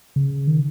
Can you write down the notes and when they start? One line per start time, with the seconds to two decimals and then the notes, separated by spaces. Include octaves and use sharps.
0.16 C#3
0.47 D#3